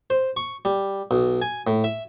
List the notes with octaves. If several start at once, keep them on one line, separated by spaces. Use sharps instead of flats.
C5
C#6
G3
B1
G#5
A2
E5